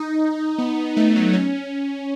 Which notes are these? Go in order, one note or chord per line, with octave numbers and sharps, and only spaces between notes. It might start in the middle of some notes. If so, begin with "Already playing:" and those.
Already playing: D#4
B3
A3
F#3
C#4